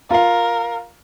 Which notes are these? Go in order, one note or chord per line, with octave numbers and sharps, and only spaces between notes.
F4 A#4 F5